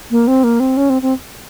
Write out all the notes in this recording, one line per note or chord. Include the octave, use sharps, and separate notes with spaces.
A#3
C4
A#3
C4
C#4
C4
C4